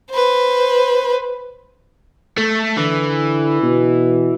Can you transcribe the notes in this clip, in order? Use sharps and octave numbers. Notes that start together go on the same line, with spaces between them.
B4 C5
A3
D3 E3
B2